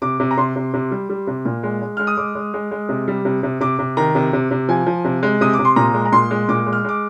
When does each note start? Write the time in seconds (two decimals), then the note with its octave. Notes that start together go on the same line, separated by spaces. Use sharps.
0.02 C3 D6
0.20 C3
0.31 A#5
0.37 C3 C6
0.56 C3
0.74 C3
0.91 G3
1.09 G3
1.27 C3
1.45 A#2
1.63 G#3
1.81 G#3
1.97 G#3 F6
2.07 D#6
2.17 G#3 D6
2.35 G#3
2.54 G#3
2.71 G#3
2.89 C3
3.08 G3
3.25 C3
3.43 C3
3.60 C3 D6
3.79 C3
3.97 D#3 A#5
4.15 C3
4.33 C3
4.51 C3
4.69 F3 G#5
4.86 F3
5.05 C3
5.23 G#3
5.41 C3 D#6
5.53 D6
5.59 C3
5.65 C6
5.76 A#2 A#5
5.94 G#3
6.05 A#5
6.12 A#2 C6
6.31 G#3
6.49 A#2 D6
6.66 G#3
6.73 F6
6.84 G#3 D6